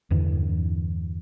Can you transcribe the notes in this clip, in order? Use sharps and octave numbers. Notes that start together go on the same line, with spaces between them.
E2 G2 D3 E3